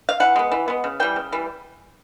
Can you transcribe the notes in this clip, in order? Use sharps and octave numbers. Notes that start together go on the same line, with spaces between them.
F5
E3 F#5
G#3 B3
E3
G#3 B3
C#3
E3 G3 G5
C#3
E3 G3